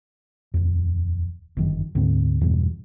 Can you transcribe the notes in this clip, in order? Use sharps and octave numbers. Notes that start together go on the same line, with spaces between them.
D#1 F2
G1 F#2 D#3
D2 G#2 C4
E2 G2 B2